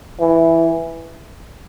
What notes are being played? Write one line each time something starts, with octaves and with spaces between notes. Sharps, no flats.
E3